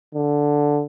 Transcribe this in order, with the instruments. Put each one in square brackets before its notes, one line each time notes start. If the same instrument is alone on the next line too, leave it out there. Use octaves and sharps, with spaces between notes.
[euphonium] D3